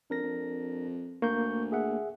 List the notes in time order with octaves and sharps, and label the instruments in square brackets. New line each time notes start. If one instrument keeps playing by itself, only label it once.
[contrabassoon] F2 [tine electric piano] D4 A#4 A#6
[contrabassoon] F2
[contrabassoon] D2 [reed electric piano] A#3 [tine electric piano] C#6 G6
[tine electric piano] G#4 E5 F#5